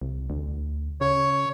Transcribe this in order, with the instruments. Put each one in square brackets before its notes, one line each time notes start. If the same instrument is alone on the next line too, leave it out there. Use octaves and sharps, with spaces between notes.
[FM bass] C2
D2
[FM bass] C#3 [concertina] C#5